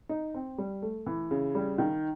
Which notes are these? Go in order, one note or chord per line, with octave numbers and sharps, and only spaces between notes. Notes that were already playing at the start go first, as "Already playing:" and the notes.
D#4
C4
G3
A3
E3
C#3
G3
D#3